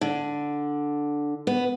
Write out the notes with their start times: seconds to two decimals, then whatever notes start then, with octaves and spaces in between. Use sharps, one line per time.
0.01 D3
1.47 B3